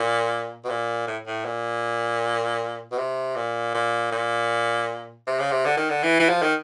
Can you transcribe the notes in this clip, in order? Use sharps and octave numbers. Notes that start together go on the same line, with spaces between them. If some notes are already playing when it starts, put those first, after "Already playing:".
Already playing: A#2
B2
A#2
A2
A2
A#2
B2
C3
A#2
A#2
A#2
C3
C#3
C3
D3
D#3
D3
E3
E3
F3
D#3